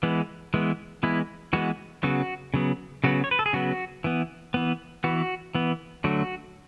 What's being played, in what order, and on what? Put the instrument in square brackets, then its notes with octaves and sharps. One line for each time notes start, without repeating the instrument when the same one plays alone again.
[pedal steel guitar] E3 G#3 B3
E3 G#3 B3
E3 G#3 B3 E4
E3 G#3 B3 F#4
C#3 F#3 B3 F#4
C#3 F#3 B3
C#3 F#3 B3 F#4
C#5
B4
A4
G#4
C#3 F#3 B3 F#4
E3 B3
E3 B3
E3 B3 F#4
E3 B3
D3 F#3 A3 F#4